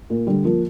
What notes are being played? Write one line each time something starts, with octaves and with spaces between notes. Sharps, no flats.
A#2
D3 G3
F3 A#3